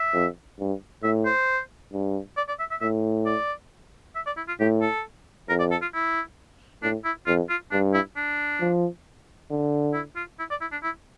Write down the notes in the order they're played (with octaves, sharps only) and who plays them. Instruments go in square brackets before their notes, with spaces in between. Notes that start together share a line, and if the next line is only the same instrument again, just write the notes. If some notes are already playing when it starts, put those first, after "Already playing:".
Already playing: [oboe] E5
[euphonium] F2
G2
[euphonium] A2 [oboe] E5
[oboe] C5
[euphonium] G2
[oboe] D5
D5
E5
E5
[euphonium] A2 [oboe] E5
[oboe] D5
E5
D5
E4
F4
[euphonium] A2 [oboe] G4
[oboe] A4
[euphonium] F2 [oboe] A#4
[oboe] D5
A4
F4
E4
[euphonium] A2 [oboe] D4
[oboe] E4
[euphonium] F2 [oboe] F4
[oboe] F4
[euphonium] G2 [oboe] D4
[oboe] E4
D4
[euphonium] F3
D3
[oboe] E4
F4
E4
D5
E4
D4
E4